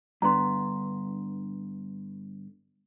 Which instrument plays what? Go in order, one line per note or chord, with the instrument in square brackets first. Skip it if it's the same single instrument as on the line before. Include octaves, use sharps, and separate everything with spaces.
[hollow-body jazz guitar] G2 D3 B3 [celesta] A#5 C6